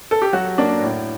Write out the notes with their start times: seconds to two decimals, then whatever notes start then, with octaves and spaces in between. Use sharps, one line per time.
0.11 A4
0.22 G4
0.33 F#3 F#4
0.58 A#3 D4
0.82 A2